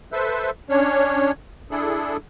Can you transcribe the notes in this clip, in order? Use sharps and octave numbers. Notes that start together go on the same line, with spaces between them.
A4 B4 C5 E5
C#4 D4 C#5
D4 E4 G#4 A4